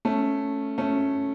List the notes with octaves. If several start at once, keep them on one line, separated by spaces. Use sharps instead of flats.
A3 C#4
A3 C#4